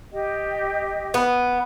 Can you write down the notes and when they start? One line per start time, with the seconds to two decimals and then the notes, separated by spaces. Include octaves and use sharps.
0.12 G4 D#5 G5
1.14 B3